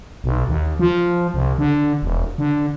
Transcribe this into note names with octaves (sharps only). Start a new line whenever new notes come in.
B1
D#2
F3
C2
D3
E1
D3